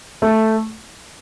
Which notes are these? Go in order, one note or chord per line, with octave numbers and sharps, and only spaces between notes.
A3